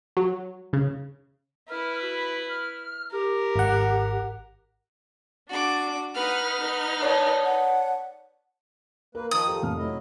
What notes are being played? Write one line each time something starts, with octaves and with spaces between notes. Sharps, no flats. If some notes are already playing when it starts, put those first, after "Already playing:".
F#3
C#3
E4 B4 F6
F#4
F6
G4 A#4
G#1 F#5
D4 F#4 D6
D#4 B4 F#5 F6
D#4 B4
C#5 D5 A5
F#5
A#3 A#4 B4
D#3 F3 D#4 D#6
G4 A4
F1 C3 F6
F#3 E4 D#5